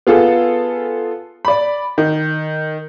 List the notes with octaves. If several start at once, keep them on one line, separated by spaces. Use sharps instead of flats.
B3 F4 G#4 A4
D5 B5
D#3